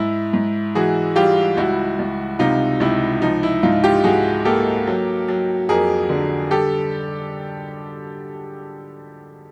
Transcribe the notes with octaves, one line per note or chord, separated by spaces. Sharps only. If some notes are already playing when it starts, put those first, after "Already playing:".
Already playing: G#2 E4
G#2
E3 F#4 G#4
G3 F4 G4
C#2 E4 F#4
C#2
C3 D#4 F4
C#2 E4
F3 D#4
E4
G#2 D#4 F4
F4 G4
G#2 F#4 G#4
A#3 G4 A4
F#3
F#3
F2 G#4 A#4
D3
G3 G4 A4